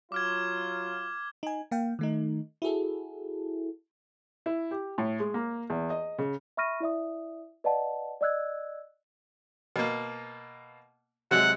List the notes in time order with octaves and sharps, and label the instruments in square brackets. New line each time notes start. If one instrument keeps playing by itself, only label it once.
[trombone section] F#3 F4 [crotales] D6 F6 G#6
[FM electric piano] D#4 G#5
A#3 F5 G5
D#3 A3 D#4
E4 F#4 G#4 A4
[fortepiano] E4
G4
A2
G#3
A#3
E2
D#5
C#3
[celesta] E5 B5 C#6 F6 A#6 D#7
E4 D5 E5 D#6
B4 D5 D#5 F5 F#5 A5
D5 D#5 E6 F#6 G#6
[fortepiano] B2 A#3
[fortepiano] C3 F#3 G#3 [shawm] F#5